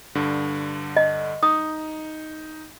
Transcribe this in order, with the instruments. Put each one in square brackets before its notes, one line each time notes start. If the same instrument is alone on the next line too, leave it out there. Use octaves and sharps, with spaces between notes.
[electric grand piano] G2 D3
[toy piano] D#5
[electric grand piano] D#4 [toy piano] D#6